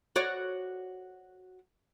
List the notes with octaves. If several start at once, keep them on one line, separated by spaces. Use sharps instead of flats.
F#4 C#5 D5